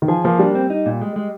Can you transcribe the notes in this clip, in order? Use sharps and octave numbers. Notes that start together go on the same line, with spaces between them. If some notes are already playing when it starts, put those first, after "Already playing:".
D#3
F3 G#4
F3 A#3
G3 D4
C4
D#4
A#2
G#3
G#3